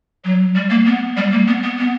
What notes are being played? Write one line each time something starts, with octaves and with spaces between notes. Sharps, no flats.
F#3
G3
A#3
B3
G3
A#3
B3
B3
B3